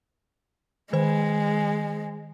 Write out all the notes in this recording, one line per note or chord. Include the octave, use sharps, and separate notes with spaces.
D#3 G#3 C5